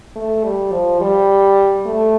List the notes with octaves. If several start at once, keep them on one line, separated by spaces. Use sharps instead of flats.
A3
G3
F3
G3
A3